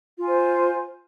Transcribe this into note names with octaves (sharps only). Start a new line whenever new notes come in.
F4 C5 G#5